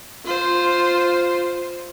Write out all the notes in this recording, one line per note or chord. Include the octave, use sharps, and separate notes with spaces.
F4 C5